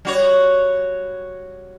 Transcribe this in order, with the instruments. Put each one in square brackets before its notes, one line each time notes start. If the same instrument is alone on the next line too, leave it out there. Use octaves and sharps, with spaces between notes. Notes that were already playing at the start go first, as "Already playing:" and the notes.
[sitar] G3 F#4 C#5